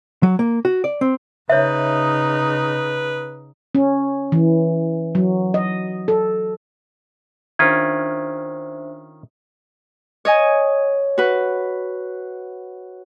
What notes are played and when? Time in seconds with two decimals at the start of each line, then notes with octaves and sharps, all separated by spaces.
0.23 F#3
0.39 A#3
0.65 F#4
0.84 D5
1.01 C4
1.50 C#3 D#4 B4 C#5 E5
3.75 C#4
4.32 E3
5.15 F#3
5.54 D#5
6.08 A4
7.59 D#3 C#4 D4 F4 C5 E5 G#6
10.25 C#5 D#5 G#5
11.18 F#4 B4